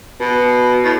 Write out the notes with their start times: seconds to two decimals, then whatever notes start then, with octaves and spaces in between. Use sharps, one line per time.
0.20 B2
0.84 A2